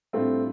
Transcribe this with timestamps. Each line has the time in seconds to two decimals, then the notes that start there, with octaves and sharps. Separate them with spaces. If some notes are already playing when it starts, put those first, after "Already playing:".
0.13 A2 G3 A3 C4 D4 F4